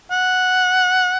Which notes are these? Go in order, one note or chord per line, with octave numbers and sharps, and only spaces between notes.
F#5